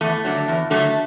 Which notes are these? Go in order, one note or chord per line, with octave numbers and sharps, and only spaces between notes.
E2 A3
D3 F#3
E2
D3 F#3 A3